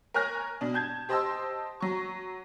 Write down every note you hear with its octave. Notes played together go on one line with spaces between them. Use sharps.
A#4 C#5 G#5 F6 F#6 A#6
B2 D4
A5 G6 G#6
G4 C5 D#5 A5 C6 E6
F#3 C#6